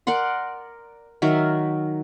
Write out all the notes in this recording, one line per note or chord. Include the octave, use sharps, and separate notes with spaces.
A#4 D5 F#5 C6
D#3 F#3 A#4 E5